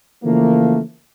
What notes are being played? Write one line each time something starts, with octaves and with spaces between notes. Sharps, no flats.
C#3 E3 F3 A3 A#3